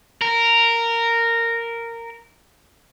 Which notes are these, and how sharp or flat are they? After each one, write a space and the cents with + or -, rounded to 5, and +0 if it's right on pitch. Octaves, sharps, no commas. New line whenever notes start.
A#4 -10